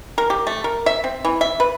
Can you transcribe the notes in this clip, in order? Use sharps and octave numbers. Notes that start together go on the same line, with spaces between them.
A#4
G4
A3
A#4
E5
C4
E3
E5
B4